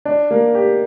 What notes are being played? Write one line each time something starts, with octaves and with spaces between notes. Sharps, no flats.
D4
A#3
G4